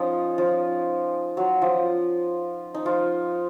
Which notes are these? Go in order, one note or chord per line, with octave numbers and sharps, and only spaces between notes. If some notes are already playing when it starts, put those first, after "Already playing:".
Already playing: F3 C#4 D#4 F4
F3 F4
F#3 F#4
F3 F4
D#4
F3 F4